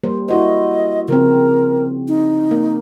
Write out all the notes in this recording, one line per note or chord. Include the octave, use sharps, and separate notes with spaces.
G3 A#3 C5
E4 F#4 C5 D#5
C#3 F3 C4 A#4
D#4
A#3